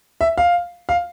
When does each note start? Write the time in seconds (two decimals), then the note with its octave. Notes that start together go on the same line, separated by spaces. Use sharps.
0.21 E5
0.38 F5
0.89 F5